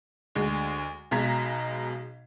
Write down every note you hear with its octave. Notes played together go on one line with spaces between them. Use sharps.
D2 G#3
B1 B2 G#3 A#5 G#6 B6